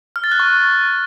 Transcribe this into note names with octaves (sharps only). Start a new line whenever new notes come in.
F6
A6
F#6
C#6